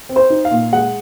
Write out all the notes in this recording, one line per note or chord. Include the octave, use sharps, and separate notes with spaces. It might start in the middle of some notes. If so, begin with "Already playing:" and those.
C4
C5
D#4
F5
A#2
G#3 F#5